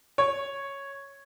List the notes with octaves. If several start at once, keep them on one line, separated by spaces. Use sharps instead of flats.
C#5